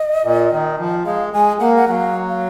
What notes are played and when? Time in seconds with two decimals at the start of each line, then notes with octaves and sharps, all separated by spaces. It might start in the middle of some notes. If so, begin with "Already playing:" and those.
Already playing: D#5
0.24 A#2
0.51 D#3
0.79 F3
1.05 G#3 F5
1.33 G#3 G#5
1.60 A#3 F#5
1.76 F#5
1.87 F#3 F5 F#5
2.28 F5